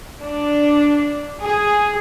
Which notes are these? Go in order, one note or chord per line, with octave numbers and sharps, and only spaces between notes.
D4
G#4